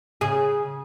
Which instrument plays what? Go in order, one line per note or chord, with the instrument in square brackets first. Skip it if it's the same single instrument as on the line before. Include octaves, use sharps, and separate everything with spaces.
[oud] C#3 G#4